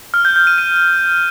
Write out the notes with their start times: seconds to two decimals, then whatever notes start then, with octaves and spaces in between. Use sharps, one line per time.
0.14 F6
0.25 G6
0.36 G6
0.47 D#7
0.58 D#7